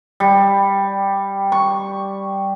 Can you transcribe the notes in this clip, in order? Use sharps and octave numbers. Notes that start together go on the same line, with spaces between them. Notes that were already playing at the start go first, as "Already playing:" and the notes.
G3
C#6